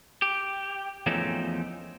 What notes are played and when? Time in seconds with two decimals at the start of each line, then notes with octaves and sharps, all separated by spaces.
0.22 G4
1.06 E2 F3 A3 C4 C#4 D#4